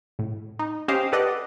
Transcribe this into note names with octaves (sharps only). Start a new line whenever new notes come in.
A2
D#4
C#4 G4 C5 D#5 F5 G5
G4 A4 B4 D5 D#5 F#5